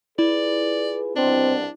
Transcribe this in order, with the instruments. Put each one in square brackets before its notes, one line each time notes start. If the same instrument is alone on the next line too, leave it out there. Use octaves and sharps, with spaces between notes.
[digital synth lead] E4 [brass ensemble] F4 G#4 B4 [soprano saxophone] D5
[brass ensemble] C2 B2 [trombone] C4 [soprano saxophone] D4